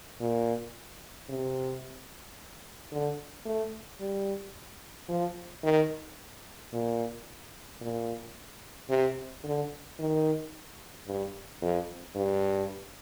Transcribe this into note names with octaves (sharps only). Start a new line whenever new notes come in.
A#2
C3
D3
A3
G3
F3
D#3
A#2
A#2
C3
D3
D#3
G2
F2
G2